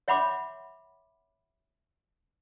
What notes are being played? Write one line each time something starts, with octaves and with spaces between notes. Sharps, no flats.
C#5 E5 F#5 B5 C6 D6